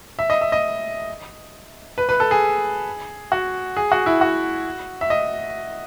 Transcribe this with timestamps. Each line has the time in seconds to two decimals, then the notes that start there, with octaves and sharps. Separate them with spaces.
0.19 E5
0.30 D#5
0.41 E5
0.52 D#5
1.98 B4
2.09 B4
2.20 A4
2.31 G#4
3.32 F#4
3.77 G#4
3.92 F#4
4.06 E4
4.21 F#4
5.01 E5
5.10 D#5